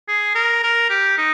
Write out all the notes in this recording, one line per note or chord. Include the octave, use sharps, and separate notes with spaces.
G#4
A#4
A#4
G4
D#4